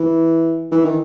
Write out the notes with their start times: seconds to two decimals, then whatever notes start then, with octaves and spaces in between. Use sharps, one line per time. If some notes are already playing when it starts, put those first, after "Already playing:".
Already playing: E3
0.72 E3
0.85 D#3